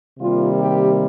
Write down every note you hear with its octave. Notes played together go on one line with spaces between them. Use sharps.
C3 D#3 G3 A#3 F4
G4